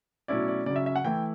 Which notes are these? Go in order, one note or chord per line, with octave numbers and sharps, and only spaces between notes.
B2 F#3 A3 C#4 E4 D5
D5
C#3 F#3 C#4 D5
E5
E5
F#5
E3 A3 E4 G5